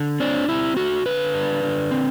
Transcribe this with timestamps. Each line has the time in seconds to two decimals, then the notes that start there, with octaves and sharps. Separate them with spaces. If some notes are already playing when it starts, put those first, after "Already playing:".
Already playing: D3
0.20 C4 D4
0.49 C4 E4
0.77 A3 F#4
1.06 D3 B4
1.34 D4
1.63 D3
1.91 C4